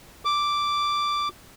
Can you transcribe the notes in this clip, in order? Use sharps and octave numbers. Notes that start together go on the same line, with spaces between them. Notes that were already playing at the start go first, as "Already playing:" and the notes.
D6